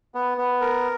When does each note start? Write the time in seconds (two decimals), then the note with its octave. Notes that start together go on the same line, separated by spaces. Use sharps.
0.15 B3
0.38 B3
0.61 A#4